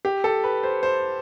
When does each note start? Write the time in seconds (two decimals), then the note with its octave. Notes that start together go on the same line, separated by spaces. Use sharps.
0.05 G4
0.24 A4
0.44 B4
0.63 C5
0.83 C5